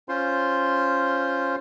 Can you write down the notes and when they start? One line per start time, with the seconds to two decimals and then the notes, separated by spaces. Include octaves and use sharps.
0.09 C#4 F4 C5 C6